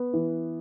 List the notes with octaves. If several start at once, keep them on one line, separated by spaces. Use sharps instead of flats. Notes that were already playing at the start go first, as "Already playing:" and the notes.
Already playing: B3
E3